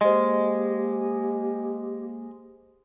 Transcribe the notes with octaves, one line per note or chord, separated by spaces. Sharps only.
G#3 A#3 G4 C5 D#5